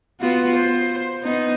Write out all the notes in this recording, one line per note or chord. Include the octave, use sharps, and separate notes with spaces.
B3 F4 F#4
C5
B3 D#4